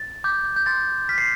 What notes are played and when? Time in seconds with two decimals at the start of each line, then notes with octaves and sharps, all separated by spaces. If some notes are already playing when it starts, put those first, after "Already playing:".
Already playing: A6
0.24 D6 G6
0.56 G6
0.66 C6 A6
1.09 F6 B6
1.18 C7